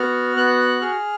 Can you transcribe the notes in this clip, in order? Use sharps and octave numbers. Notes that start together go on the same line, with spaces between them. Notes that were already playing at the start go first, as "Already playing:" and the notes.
Already playing: B3 F#4 F6
B3 F#6
G#4 F6